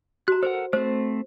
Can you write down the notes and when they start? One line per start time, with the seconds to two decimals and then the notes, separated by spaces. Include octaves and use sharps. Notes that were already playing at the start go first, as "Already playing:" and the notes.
0.28 F#4 A#5 F#6
0.43 A4 A#4 C5 F#5
0.73 A3 C4 C5